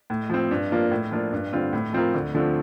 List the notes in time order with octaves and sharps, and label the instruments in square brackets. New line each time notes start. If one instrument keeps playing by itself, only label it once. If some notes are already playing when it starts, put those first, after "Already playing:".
[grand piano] A2
F3 C4
G2
F3 A#3 D4 F4
A2
F3 A#3 D4 F4
G2
D3 G3 C4 F4
A2
F3 C4 F4 A#4
D2
D3 F3 A3 C4